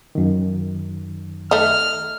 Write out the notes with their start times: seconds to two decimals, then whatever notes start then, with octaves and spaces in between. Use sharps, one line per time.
0.15 F#2 D#3
1.51 A3 D#4 F6